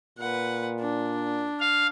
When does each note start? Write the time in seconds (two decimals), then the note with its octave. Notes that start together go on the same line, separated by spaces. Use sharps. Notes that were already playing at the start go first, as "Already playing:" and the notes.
0.18 A#2 B4 F#5
0.80 D4
1.60 F5